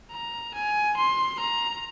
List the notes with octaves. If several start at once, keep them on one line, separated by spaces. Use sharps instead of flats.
A#5
G#5
C6
A#5